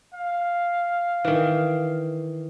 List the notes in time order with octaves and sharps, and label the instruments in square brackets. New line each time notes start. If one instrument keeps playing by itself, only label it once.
[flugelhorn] F5
[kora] D#3 E3